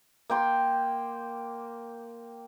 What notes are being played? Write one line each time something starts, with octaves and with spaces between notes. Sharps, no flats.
A#3 G5 C6